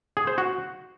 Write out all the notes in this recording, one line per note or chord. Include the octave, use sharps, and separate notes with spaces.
G#4
C5
F#4